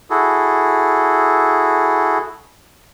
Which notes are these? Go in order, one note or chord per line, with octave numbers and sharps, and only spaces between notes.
E4 F#4 G#4 A4